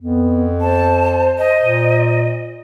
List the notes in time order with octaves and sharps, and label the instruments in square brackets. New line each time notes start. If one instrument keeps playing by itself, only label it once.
[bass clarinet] F2 [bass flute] B3
[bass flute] C5 [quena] A5
[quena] D#5
[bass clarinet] A#2